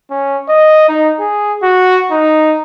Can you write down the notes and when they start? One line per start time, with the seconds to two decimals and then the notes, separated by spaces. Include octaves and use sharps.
0.11 C#4
0.49 D#5
0.89 D#4
1.20 G#4
1.63 F#4
2.11 D#4